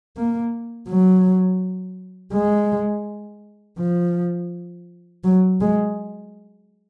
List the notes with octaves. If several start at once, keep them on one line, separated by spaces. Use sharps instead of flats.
A#3
F#3
G#3
F3
F#3
G#3